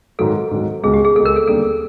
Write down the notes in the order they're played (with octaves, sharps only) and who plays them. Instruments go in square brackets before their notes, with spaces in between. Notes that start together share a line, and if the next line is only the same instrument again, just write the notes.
[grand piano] G#2 D#3 F#3 [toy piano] A4
[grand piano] G#2 D#3 F#3
[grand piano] C#2 B2 G#3 [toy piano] G#4
[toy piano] G4
G#4
[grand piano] C#2 B2 G#3 [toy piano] A4
[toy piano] A#4
A4
[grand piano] D#2 D3 G3 A#3 [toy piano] A4